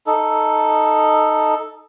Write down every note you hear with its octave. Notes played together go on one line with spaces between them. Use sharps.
D#4 A4